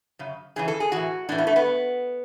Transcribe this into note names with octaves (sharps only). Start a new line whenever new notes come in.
F#2 C#3
F#2 C#3 E3 G#4
A4
G#4
A2 E3 F#4
A2 E3 D4
B3
A3
B3